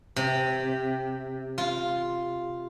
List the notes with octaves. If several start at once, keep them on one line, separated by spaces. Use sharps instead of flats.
C3
F4